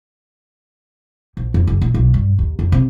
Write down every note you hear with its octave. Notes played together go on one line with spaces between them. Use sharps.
A#1
F2
F#1
A#2
B1
G2
D#2
F2
C3